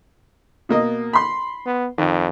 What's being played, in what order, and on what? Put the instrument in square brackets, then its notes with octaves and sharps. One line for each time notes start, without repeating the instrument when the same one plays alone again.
[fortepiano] B2 A#3 D#5
B5 C6
[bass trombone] B3
[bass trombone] F2 [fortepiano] D#3